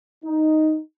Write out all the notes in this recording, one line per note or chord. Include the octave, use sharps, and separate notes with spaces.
D#4